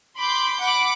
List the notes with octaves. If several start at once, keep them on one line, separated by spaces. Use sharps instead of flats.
B5 C6 D6 G6
F#5 B5 D6